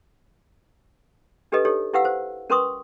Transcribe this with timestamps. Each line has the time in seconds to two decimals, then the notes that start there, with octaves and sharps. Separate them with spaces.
1.52 D4 G4 A4 B4 D#5
1.65 D#4 G4 A4 C#5
1.94 E4 G4 B4 F5 F#5 E6
2.05 C5
2.50 C#4 A#4 B4 C6 C#6 D#6